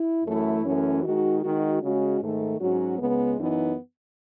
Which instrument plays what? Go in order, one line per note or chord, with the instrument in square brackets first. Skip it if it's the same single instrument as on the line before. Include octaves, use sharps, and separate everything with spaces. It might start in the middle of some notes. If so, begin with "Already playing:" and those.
Already playing: [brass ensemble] E4
F#2 E3 A3 E4
F#2 E3 A3 C#4
D#3 G#3 D#4 F#4
D#3 G#3 D#4 F#4
C#3 G#3 C#4 F#4
G#2 D#3 A3
G#2 F#3 C#4 F#4
C#2 C#3 G#3 B3
F#2 E3 B3 D#4